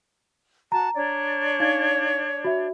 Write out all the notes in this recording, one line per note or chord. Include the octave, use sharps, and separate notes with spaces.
F#4 A5 A#5
D4 C#5 D5
D#4 F5 G#6
F#4 E5